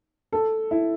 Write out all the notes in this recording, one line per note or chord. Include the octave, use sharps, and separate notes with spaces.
A4
E4